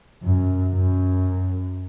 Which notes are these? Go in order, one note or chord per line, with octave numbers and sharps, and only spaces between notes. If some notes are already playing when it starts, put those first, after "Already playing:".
F#2
F#2